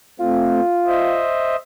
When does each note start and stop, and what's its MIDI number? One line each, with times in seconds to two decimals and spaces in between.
0.20 0.61 57
0.20 0.61 60
0.20 1.22 65
0.87 1.56 72
0.87 1.56 75
0.87 1.56 76